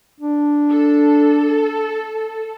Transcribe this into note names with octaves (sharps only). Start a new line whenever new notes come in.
D4
A4